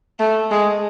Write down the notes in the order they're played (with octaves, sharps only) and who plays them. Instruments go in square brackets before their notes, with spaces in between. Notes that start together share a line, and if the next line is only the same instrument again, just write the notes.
[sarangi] A3
G#3